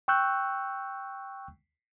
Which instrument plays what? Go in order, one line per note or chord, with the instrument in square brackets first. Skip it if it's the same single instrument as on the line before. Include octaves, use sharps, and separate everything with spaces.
[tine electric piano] G5 C#6 E6 F#6 G6